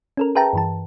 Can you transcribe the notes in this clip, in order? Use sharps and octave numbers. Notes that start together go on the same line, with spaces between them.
C#4 A4 A#4
G#4 B4 E5 G5 A5 A#5
G2 E3 A5